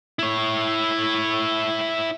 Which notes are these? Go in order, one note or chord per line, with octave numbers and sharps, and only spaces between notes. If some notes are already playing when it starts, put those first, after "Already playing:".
E4 C#5